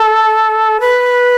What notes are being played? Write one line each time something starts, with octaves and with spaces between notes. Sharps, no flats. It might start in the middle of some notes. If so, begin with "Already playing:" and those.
Already playing: A4
B4